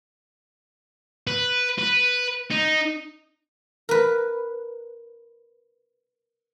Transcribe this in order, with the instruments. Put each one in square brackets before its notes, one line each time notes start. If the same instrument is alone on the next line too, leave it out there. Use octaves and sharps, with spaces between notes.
[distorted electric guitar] B4
B4
D#4
[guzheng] A#4 B4